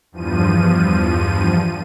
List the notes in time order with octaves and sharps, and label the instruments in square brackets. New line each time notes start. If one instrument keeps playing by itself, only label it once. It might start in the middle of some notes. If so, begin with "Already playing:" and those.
[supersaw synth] E2 G2 F3 D#7